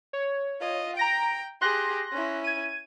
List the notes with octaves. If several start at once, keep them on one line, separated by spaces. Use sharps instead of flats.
C#5
F4 D#5
G5 A#5 A#6 D7
G4 G#4 C6 F#6 A#6
C#4 E4
G#6 D#7